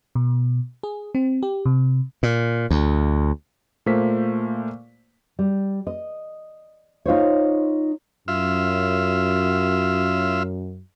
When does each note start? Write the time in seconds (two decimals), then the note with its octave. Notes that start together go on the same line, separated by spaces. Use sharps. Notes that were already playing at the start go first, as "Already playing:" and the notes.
0.15 B2
0.83 G#4
1.15 C4
1.43 G4
1.66 C3
2.23 A#2
2.71 D2
3.86 A#2 A3 A#3 F4 C5 B6
5.39 G3
5.87 D#5
7.05 D#4 F4 C5 C#5
8.28 F#2 F4 E5